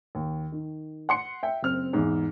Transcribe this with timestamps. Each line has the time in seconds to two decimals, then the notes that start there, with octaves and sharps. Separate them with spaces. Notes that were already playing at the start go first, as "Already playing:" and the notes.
0.15 D#2
0.52 D#3
1.09 F#5 C6 C#7
1.43 E5 G5
1.63 F#1 C4 F6
1.93 E2 G#2